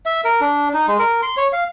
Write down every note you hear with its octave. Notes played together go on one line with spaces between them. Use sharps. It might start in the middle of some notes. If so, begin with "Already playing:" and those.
E5
A#4
D4
D#4
G#3
A#4
C6
C#5
F5